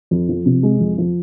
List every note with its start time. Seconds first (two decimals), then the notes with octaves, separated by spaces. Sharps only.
0.11 F2
0.29 F3
0.46 C3
0.63 G#3
0.80 F2
0.98 F3